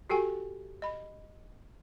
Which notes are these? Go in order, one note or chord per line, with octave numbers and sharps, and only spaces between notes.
F#4 G4 A4 G5 G#5
D#5 B5